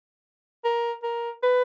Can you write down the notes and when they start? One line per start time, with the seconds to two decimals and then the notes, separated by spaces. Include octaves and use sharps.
0.64 A#4
1.03 A#4
1.43 B4